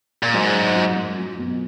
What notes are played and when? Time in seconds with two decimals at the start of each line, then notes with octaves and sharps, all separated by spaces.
0.23 A#2
0.34 G#2 F#3
0.55 F#2
0.76 F#3
0.96 F#2
1.18 F#3
1.38 B2